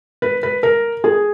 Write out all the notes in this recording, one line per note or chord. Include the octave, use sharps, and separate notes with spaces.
B4
B4
A#4
G#4